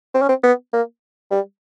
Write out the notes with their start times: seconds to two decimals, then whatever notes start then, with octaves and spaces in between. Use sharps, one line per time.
0.14 C4
0.22 C#4
0.29 C4
0.43 B3
0.73 A#3
1.31 G3